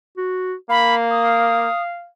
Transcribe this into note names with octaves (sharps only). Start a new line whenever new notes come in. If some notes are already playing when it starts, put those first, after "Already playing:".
F#4
A#3 F5 B5
D#6